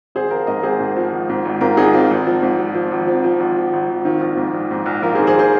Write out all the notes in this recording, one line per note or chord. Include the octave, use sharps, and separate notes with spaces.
G#1 G#4 C5
F3 F4 A#4
G#2 A#4 D#5
G#1 G#4 C5
G#2
F3
G#1
G#2
G#1
G#2 F4 A#4
G#1 D#4 G#4
G#1 C4 F4
G#1 C4
F3
G#2
F3
F3
G#1
F3 C4
F3
G#1
G#1
G#1
G#1
D#3 C4 F4
A#1
G#2
A#1
G#2
A#1
A#1 F4 A#4
G#4 C5
D#3
G#4 C5
G#4 C5